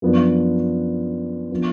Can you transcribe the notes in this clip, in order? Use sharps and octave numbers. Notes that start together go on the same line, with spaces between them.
F#2 F3 B3 D4
F3 B3 D4